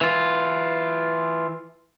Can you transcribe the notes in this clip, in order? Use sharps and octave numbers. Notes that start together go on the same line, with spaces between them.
E3 F4